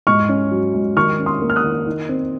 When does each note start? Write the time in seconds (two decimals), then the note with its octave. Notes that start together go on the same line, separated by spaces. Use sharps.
0.07 G#2 C#6 F6
0.29 C#4
0.51 F#3
0.74 G#2
0.96 D#3 C#6 F6
1.19 C#4
1.26 C6 D#6
1.42 A#3
1.50 F6
1.56 D#6 F#6
1.63 D#3
1.86 D#4
2.09 C4